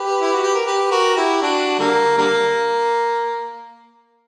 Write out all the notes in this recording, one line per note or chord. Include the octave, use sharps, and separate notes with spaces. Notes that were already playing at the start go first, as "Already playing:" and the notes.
Already playing: G4 B4
E4
F#4
G4
A#4
G4 B4
F#4 A#4
E4 G4
D4 F#4
D3 G3 A#3
D3 G3 A#3